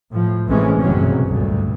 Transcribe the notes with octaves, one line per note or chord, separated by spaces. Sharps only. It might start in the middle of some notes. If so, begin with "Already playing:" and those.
A2 F3
A1 C3 E3 G#3 C#4
F#1 B1 G2 C3 F#3 C#4
D2 G2 A#2